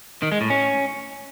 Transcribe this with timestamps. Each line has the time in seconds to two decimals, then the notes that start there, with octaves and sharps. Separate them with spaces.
0.22 D#3
0.32 G#3
0.41 A2
0.50 C#4